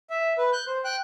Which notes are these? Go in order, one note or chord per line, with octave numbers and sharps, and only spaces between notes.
E5
B4
F#6 G6
C5
G5 F#6